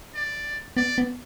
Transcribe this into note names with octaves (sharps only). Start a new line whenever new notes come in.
D5
B3 D5
B3